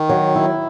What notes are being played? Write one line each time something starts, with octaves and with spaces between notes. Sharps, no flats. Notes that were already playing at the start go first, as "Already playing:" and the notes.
Already playing: D#3
F#3
E4